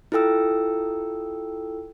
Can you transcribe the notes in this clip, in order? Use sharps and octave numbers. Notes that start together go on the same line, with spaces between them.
E4 F4 A4 G5 E6